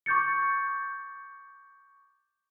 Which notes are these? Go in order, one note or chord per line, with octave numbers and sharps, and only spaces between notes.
C#6 D6 G6 A6 C#7